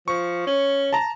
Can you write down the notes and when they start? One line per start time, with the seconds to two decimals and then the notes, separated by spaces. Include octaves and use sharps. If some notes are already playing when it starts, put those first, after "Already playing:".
0.08 F3 C#6
0.47 C#4
0.93 A5 A#5